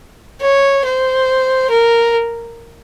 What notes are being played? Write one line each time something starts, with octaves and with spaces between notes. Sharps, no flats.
C#5
C5
A#4